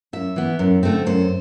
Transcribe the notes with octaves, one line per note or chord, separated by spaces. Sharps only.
F#2 E5
E3 B3
F#2
D3 A3 C4
F#2 C5